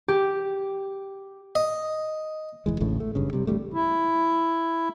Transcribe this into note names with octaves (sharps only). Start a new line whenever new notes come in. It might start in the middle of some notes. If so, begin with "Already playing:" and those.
G4
D#5
F1 E2 E3 G#3
A1 D2 A2 C#3
A3
F#1 G2 C#3
C3 G3
A1 D2 G3 A3
E4